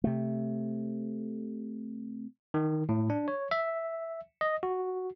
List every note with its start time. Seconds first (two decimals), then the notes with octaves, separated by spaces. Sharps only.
0.04 C3 A3
2.54 D#3
2.89 A2
3.10 D4
3.28 C#5
3.51 E5
4.41 D#5
4.63 F#4